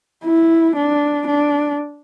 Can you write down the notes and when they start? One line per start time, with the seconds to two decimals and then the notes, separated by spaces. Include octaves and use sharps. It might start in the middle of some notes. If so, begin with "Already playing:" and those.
0.25 E4
0.76 D4
1.27 D4